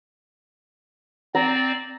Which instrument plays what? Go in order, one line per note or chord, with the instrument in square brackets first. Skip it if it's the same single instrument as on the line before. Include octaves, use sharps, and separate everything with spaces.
[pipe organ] C4 D5 [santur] A#5